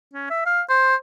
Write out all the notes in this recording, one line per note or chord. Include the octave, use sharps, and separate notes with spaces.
C#4
E5
F5
C5